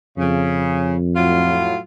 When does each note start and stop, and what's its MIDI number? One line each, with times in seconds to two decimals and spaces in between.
0.18 1.74 41
0.18 0.94 49
1.15 1.77 45
1.15 1.77 54
1.15 1.77 65